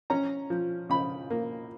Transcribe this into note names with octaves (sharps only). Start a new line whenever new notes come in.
C#4 A#5
F3
C#3 B5
A#3